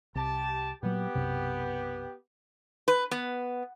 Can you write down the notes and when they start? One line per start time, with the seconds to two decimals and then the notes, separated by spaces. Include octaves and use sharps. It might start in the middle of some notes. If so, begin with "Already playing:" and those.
0.15 C2 G4 A5
0.83 A#2 F#3 B3 G4
1.15 B1 F#2 C3
2.88 B4
3.11 B3